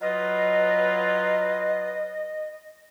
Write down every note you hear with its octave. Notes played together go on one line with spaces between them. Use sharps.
F#3 F4 B4 D#5